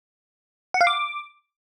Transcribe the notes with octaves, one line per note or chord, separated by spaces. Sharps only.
F#5
F5
D6